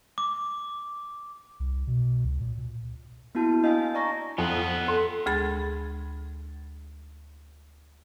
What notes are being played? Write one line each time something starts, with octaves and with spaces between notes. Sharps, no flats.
D6
C2
B2
C#2
A#2
A#3 B3 E4 F#4 A5
D4 D#5 F5 G#5
D5 F5 G#5 A#5 C#6 A#6
F2 B3 F4
A4 C6
D2 G#3 G#4 B5 A6